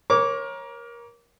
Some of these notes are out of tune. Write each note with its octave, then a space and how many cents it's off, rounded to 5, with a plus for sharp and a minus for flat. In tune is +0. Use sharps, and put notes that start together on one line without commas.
A#4 +25 C#5 -20 D6 -20